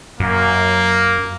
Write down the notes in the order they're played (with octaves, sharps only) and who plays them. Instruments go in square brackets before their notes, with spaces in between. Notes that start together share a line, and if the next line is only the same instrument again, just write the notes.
[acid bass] F#2 [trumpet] A#3